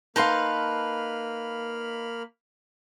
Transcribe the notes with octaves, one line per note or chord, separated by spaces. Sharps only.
A#3 D#4 B4 F5 A5 B5 C6 F6